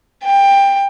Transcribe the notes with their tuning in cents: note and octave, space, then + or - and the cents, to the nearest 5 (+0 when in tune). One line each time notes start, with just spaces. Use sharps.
G5 +15